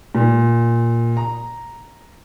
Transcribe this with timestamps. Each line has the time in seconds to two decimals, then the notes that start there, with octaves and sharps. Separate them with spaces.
0.15 A#2
1.17 A#5